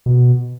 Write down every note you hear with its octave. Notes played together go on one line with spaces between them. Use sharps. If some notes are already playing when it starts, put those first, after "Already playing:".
B2